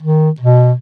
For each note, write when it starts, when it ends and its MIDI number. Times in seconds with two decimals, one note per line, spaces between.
0.03 0.30 51
0.40 0.73 47